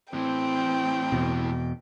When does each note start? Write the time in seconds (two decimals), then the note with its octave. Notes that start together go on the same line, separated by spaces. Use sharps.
0.14 A2 E3 C4 G5
1.12 E2 B2